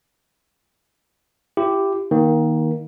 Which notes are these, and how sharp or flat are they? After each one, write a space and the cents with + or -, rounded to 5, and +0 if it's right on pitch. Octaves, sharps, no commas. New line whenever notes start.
E4 +40 G4 +0
D#3 +15 A#3 +25